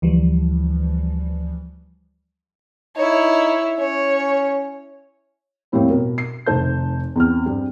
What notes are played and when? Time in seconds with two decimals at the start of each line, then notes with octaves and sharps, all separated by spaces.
0.02 D2 E3 F3 G3
2.96 D#4 E4 C#5
3.78 C#4 C#5
5.72 F2 A2 G3 A#3 C4
5.89 B2 A#4
6.18 C7
6.46 F1 D#3 C5 A5 G6
7.16 E2 C4 F6
7.46 G2 C4